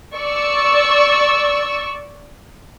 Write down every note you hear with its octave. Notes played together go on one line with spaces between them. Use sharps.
D5 C#6 E6